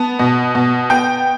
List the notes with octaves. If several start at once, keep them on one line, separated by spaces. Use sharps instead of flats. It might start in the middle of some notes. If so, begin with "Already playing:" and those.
Already playing: B3 A5
B2
B2
B3 G5